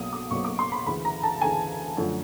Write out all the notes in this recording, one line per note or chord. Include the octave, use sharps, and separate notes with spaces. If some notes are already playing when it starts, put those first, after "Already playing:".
Already playing: B1 B2 F#3 A#3 D#6
D6
B1 B2 F#3 A#3 C#4 C#6
D6
C6
B5
D2 C#3 E3 B5
A#5
A5
D2 C#3 E3 G#5
F#2 D3 F3 A3